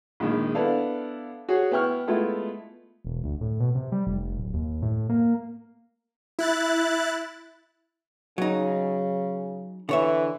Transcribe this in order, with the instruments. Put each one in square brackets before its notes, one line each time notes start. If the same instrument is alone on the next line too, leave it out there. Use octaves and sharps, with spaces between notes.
[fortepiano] A#1 D#3 G#3
B3 D4 E4 A4 D5 F5
F#4 G#4 C#5
B3 E4 G5 C#6 F6
G#3 A3 B3 E4 F4
[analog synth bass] E1
D2
A2
B2
C3
G3
F1
D1
D#2
A2
A#3
[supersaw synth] E4 F#6 A6
[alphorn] C#3 [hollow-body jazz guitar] F#3 D#4
[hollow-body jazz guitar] D3 C#5 E5 [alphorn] E3